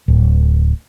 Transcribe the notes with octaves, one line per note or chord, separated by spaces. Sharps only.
D1